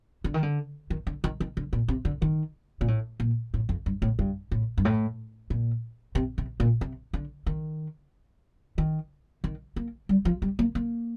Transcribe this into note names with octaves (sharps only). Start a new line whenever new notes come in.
D3
D#3
D3
D#3
D3
D#3
D#3
D3
A#2
C3
D3
D#3
A#2
A2
A#2
A2
F2
G2
A2
G2
A2
G2
A2
A#2
C3
C3
A#2
C3
D3
D#3
D#3
D#3
A#3
G3
F3
G3
A#3
A#3